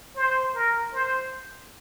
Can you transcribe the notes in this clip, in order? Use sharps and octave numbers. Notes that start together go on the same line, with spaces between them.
C5
A#4
C5